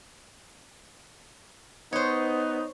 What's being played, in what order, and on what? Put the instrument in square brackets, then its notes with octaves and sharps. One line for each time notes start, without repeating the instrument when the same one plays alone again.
[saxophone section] B3 D#4 [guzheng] C5 C#5